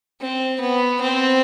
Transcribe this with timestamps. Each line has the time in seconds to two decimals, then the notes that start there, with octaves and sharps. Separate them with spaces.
0.21 C4
0.61 B3
1.01 C4